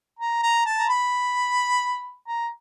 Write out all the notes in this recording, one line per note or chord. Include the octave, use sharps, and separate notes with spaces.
A#5
A#5
A5
A#5
B5
A#5